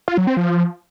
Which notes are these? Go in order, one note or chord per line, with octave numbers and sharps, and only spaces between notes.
F4
F#3
C4
F3